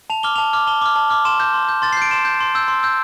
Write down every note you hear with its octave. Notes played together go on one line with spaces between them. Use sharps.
A5 F7
D6 F6 G7
A5 F7
D6 F6
A5 G7
D6 F6
A5
D6 F6
C6 E7
G6
C6
G6
C6 A6
C7
G6 D7
C6 E7
G6
C6
E6 G6
C6
E6 G6